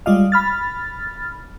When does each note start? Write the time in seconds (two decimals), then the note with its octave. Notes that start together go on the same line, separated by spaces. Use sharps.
0.06 G3 G#3 F4 D5 D#5 F5
0.32 B5 F6 A6